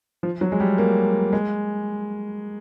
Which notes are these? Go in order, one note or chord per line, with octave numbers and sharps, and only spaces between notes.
F3
F#3
G#3
G3
A#3
G#3